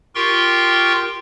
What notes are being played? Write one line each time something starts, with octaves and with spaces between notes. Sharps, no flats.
F4 G4 A#4 G5 C6 C#6